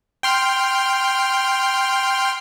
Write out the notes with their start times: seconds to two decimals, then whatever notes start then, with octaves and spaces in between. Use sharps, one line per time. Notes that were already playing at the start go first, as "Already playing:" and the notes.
0.23 G5 C6 F6